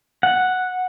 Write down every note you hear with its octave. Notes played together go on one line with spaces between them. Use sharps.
F#5